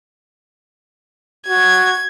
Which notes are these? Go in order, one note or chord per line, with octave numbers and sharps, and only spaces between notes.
F#4 G#6